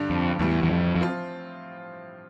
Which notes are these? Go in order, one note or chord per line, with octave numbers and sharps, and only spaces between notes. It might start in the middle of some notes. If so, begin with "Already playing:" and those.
Already playing: G2 D3 G3 D4
F2
E2 A2 E3 G3
E2
F2
F2
F3 C4 F4